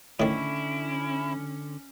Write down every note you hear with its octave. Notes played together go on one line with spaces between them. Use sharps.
A2 D3 D#3 C#4 E4 C#6